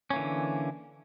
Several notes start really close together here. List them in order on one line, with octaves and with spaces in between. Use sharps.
C#4 A#3 E3 D3